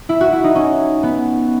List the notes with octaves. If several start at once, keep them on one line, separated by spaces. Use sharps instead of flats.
E4
F#4
E4
D#4
C#4
B3